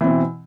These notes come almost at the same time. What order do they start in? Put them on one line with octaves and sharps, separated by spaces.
E3 C4 B2